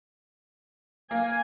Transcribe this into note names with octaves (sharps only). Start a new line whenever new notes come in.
A#3 G#5